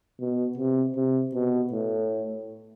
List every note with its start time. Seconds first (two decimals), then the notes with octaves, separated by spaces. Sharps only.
0.20 B2
0.57 C3
0.96 C3
1.34 B2
1.72 A2